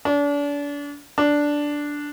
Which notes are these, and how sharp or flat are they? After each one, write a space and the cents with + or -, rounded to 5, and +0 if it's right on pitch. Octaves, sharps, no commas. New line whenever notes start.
D4 -35
D4 -5